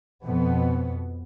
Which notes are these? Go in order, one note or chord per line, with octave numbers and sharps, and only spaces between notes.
F2 B2 B3